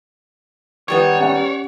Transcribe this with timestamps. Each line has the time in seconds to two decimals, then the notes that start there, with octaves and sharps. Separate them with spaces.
0.88 D#3 G3 B3 C#5
1.19 C#4 G4 F#5